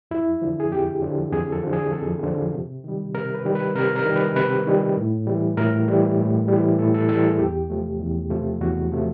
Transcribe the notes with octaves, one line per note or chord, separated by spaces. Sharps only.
F2 E4
D3 F3
G#4
F2 G4
D3 F3
F2 G#4
A4
D3 F3
G#4
F2 A4
D3 F3
C3
D#3 G3
C3 A#4
B4
D#3 G3
B4
C3 A#4
A#4
D#3 G3
B4
C3 B4
D#3 G3
A2
E3 G3
A2 A#4
E3 G3
A2
E3 G3
A2 A4
A4
E3 G3 A4
G#4
E2 G4
C3 F3 A3
E2
C3 F3 A3
E2 F#4
C3 F3 A3